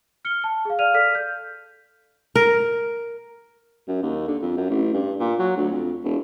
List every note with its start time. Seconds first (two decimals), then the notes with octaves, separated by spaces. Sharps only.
0.25 F6 C#7 G7
0.44 A5
0.65 G#4 F5
0.79 D5 F5 F6 D#7 F7
0.94 A4 D5 F6 B6
1.15 G6
2.35 A#4
3.88 F#2
4.03 D#2
4.28 D3
4.42 F2
4.57 F#2
4.70 A1
4.94 G2
5.20 A#2
5.39 F#3
5.57 D2
5.72 F2
6.04 E1